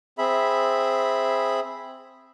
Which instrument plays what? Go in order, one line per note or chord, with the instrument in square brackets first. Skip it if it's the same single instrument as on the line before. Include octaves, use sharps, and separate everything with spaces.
[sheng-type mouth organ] C4 G#4 E5 B5